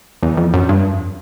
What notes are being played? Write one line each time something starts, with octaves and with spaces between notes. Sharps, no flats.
E2
F2
F#2
G2
F2